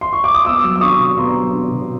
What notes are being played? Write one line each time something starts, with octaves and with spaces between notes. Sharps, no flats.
C6
C#6
D6
D#6
B3 D6 E6
F#3
E6
D4 C#6 D#6
B2
B3 A#5 C6
F#3
D4
B2